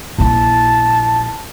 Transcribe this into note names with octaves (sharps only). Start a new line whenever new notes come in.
A#1 E4 A5